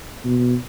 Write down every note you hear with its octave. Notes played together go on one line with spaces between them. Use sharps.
B2